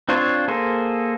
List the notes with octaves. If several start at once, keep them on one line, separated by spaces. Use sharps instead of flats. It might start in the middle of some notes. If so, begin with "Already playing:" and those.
C4 D4 F4 C5 C#5
A#3 G#4 A4 C5